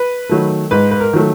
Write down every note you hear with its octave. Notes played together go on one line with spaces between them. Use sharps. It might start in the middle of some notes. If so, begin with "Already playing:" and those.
Already playing: B4
D#3 F#3 A3
G#2 B4
B4
A#4
D#3 F#3 A3